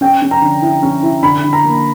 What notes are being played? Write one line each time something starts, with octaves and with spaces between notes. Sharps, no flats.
C#4 G5
C#4
A#5
D3
E4
C#4
E4
D3 B5
D3
A#5
A#3